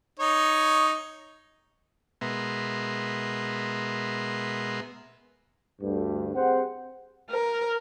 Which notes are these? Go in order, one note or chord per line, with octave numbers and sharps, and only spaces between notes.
D#4 C#5
B2 G#3 B3 A#4 E5 C6
D2 G2
C4 G4 G#4 C5 F#5
A#4